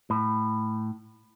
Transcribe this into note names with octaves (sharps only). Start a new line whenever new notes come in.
A2